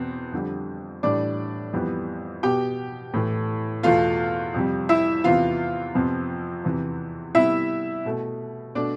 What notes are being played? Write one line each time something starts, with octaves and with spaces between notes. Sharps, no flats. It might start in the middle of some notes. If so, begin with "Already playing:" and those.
Already playing: E2 B2 B3 C4
F2 D3 G3
A2 E3 G3 D4 D5
F2 E3 G3 B3
B2 B3 G4 G5
A2 E3 A3
E2 B2 A3 F4 F5
F2 C3 G3
E4 E5
E2 C3 E3 B3 F4 F5
F2 C3 F3 B3
E2 C3 E3
C3 G3 B3 E4 E5
B2 A3
B2 A3 D4 D5